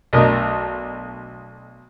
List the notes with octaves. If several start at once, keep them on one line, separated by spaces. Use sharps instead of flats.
B1 A3 D4 A#4 D#5